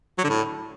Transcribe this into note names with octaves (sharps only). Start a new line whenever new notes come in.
F#3
D3
A2